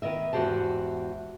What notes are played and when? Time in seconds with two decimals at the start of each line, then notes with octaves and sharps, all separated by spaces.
0.02 D#3 B3 D#5 E5
0.33 E2 G#2 F#4 G4 C5 A5